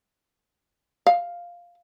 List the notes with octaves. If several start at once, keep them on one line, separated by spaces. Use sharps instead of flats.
F5